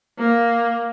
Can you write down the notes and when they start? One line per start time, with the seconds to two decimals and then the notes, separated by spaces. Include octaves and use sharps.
0.18 A#3